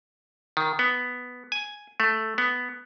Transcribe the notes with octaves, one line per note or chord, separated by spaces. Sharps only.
D#3
B3
G#5
A3
B3